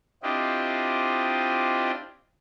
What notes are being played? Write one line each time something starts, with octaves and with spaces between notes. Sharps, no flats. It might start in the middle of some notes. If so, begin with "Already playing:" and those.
C4 D4 E4 F4 G4 D#5